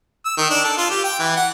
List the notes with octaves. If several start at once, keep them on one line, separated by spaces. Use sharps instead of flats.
E6
D#3
D4
A4
F4
G4
G5
E3
F#5